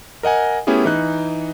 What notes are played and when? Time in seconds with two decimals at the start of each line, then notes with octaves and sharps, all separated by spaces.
0.23 A#4 D#5 F#5 G#5
0.67 A3 B3 C#4 E4 G4 G#4
0.85 E3 D#4 F#6